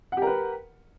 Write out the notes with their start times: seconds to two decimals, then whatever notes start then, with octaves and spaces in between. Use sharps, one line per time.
0.12 F#5
0.17 G4
0.22 A#4
0.27 B4